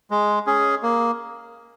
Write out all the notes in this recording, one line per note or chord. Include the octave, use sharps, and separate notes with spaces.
G#3
C#4 G#4
A#3